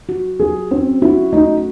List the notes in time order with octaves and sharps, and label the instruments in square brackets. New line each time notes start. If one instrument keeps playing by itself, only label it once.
[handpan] F#4
[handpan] F#3 [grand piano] G#4
[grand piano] C4 [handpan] C#4
[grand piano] E4 [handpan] F#4
[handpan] A3 [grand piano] D#4